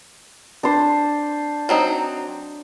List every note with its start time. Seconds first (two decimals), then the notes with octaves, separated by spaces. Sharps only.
0.63 D4 C5
1.69 F#3 C4 D#4